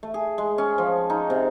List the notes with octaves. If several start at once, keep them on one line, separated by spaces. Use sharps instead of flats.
A3
G#4
G#3
C#4
F3
D#4
C3